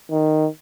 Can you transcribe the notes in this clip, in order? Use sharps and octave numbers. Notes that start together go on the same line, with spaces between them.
D#3